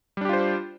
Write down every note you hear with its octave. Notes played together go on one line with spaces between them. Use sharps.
G3 D4 F4 G4 C5